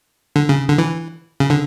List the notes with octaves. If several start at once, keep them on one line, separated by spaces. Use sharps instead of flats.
D3
C#3
D3
E3
C#3
D3